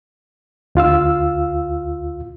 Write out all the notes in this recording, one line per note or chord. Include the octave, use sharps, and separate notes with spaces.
D2 F4 F5 E6